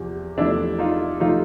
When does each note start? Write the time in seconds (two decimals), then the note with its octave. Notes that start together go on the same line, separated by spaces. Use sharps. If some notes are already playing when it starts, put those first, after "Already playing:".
Already playing: E2 C3 F3
0.37 E2 C3 F3 A3 D4 E4
0.78 D#4 F4
1.20 C3 F3 A3 D#4 F4